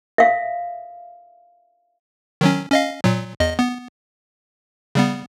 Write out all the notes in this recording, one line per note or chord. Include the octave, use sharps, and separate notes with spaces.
E5 F5
D#3 F#3 C#4
C#4 D#5 F5
A#2 F#3
E2 D#5
B3
C#3 G3 B3